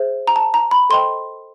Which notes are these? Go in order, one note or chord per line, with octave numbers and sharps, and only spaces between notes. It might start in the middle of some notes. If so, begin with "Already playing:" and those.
Already playing: G#4 C5 E5
A#5
A5
A#5
B5
A4 C5 D#5 G5 C6